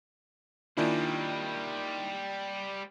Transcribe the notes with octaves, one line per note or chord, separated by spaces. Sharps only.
D#3 G3 A#3 C4 D4 E4 F4 G#5